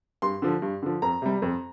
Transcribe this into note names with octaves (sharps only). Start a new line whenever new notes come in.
G2 C6
D3 F3
G2
D3 F3
F2 A#5
C3 G3
F2